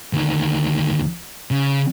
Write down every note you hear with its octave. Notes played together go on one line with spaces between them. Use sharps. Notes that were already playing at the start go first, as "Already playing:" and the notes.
D2 D#3
C#3